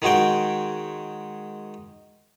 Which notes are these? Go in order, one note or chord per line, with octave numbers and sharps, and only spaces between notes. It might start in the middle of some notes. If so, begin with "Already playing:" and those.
D#3 G#3 F#4 C#5 G5